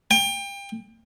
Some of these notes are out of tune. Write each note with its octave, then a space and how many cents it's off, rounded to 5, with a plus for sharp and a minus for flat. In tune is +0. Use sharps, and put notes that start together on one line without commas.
G5 +30